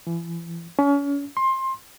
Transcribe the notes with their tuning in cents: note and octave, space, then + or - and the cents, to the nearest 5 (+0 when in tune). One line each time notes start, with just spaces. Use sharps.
E3 +35
C#4 +35
C6 +20